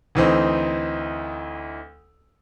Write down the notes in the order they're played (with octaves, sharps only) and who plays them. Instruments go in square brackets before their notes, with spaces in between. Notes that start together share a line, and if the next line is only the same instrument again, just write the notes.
[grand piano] D2 E3 C4 D#4